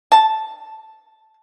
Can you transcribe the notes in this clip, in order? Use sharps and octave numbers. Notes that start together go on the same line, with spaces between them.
A5